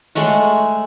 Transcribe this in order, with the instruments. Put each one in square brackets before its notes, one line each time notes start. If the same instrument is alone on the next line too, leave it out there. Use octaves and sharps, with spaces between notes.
[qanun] G#3 A3 C#5 F#5